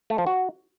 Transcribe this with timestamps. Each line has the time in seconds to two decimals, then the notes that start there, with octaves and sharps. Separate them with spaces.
0.10 A3
0.18 F3
0.27 F#4